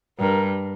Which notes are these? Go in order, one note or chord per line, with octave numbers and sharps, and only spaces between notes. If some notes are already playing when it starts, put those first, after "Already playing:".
G2 A#4